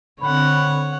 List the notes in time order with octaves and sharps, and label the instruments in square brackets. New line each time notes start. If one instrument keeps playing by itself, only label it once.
[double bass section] D3 C4 [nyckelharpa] C#5 F#5 [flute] B5